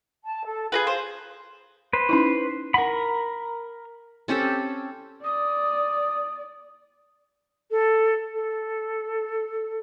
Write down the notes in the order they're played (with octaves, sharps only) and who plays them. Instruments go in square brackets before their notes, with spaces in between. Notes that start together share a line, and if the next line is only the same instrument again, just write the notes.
[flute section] A5
A4
[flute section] F4 [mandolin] G#4 A#4 B4
[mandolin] C5
[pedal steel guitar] B4 C5
[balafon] C#4 D#4 E4
[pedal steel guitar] A#4 B5 [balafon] F#5
[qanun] C4 C#4 G4 A4
[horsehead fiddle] D5 [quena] D#6
[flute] A4
A4